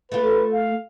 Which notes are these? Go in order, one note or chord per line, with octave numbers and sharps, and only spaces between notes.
A3 F4 B4
F5